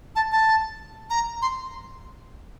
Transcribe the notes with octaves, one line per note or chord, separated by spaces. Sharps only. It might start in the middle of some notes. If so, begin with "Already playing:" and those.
A5
A5
A#5
C6